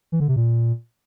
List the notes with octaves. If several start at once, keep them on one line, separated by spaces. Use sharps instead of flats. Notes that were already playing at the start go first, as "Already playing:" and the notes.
E3
D3
C3
A#2